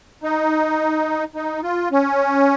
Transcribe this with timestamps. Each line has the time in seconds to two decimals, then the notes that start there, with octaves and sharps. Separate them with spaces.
0.23 D#4
1.35 D#4
1.63 F4
1.92 C#4